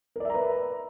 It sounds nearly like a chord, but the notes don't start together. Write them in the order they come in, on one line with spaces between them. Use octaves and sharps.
A#4 D5 E5 A#5 B4